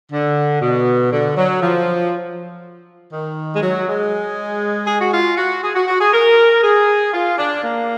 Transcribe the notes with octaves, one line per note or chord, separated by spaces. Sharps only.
D3
B2
D3
F#3
F3
D#3
G#3
F#3
G#3
G#4
F#4
F4
F#4
G#4
F#4
F#4
G#4
A#4
G#4
F4
D4
A#3